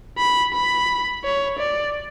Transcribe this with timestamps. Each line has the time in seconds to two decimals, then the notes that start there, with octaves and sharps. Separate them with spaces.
0.18 B5
0.54 B5
1.24 C#5
1.59 D5